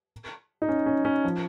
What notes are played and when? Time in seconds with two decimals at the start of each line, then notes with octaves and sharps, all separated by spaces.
0.62 D#4
0.68 C#4
0.86 C#4
1.05 C#4
1.24 F3